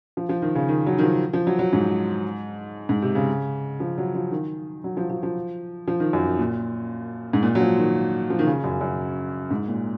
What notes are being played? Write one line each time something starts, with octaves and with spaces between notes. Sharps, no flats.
F3
F3
D#3
C#3
D#3
F#3
D#3
F3
F3
F#3
F#3
G#2
G#2
C3
C#3
F3
F#3
F3
D#3
F#3
F3
F3
F3
F3
D#3
F#2
A#2
G#2
A#2
F#3
F3
D#3
F3
D#3
C#3
F#2
F#2
G#2
A#2